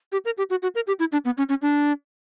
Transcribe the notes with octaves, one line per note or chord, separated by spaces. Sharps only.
G4
A#4
G4
F#4
F#4
A#4
G4
E4
D4
B3
C#4
C#4
D4